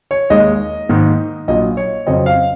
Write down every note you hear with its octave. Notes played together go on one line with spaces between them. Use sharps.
C#5
D#2 D#3 G#3 D#5
G#2 D#3 A#3
A#1 A#2 F#3 D#5
C#5
F2 C#3 F#3 C4 D#5
F5